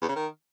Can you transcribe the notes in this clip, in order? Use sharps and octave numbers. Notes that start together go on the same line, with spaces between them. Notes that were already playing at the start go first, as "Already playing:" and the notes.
E2
C#3
D#3